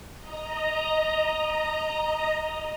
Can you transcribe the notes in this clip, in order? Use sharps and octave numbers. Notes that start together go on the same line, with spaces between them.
D#5 A#5